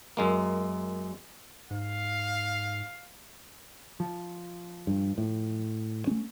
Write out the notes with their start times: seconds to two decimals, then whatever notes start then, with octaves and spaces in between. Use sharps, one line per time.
0.17 F#2 G#3 A#3
1.71 G#2 F5
4.00 F3
4.87 G2
5.18 A2
6.07 A3 C#4